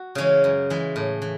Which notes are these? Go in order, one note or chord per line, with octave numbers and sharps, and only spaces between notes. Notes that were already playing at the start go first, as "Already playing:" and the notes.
Already playing: F#4
C#3 E3 G#3 C#4
F#2
E3 G#3
A2
E3